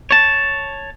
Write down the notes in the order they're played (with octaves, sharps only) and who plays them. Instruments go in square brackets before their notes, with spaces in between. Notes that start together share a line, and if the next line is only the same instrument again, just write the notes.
[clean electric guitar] C#5 A5